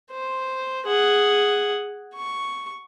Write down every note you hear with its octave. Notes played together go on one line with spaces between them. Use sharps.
C5
G#4 F#5
C#6